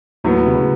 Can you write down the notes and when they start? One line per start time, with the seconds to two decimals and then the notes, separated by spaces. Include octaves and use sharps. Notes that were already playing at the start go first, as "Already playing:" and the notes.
0.24 D#2 A2 D#3 F#3 B3
0.47 C3
0.54 C#3